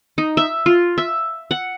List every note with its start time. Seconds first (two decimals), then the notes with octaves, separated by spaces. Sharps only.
0.18 D#4
0.37 E5
0.66 F4
0.98 E5
1.51 F#5